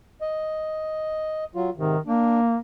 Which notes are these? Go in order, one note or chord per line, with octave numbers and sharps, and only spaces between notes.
D#5
F#3 F4
G#2 C3 D#3
A#3 D4